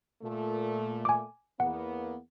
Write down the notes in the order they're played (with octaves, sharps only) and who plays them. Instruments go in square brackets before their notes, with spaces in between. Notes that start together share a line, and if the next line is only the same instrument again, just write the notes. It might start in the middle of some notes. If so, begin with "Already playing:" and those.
[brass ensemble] A#2 A3
[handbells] G#5 D6
[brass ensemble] E2 A#3 B3 [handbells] F#5